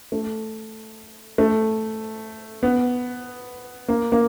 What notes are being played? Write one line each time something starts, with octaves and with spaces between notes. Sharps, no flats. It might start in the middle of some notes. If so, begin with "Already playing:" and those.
A3
A3
B3
A#3
A#3